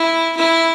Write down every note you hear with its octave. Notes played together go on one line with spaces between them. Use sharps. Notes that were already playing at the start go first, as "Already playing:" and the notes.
Already playing: E4
E4